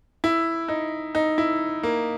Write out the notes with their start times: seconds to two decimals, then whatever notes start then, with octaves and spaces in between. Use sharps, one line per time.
0.24 E4
0.68 D#4
1.15 D#4
1.38 E4
1.83 A#3